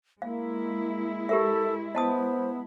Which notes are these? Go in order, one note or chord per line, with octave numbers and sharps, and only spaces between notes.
G#3 A#3 E4 F5
G4 A4 A#4 E5
B3 C5 D#5 A5 D#6